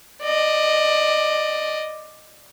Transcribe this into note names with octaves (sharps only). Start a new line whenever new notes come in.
D5 D#5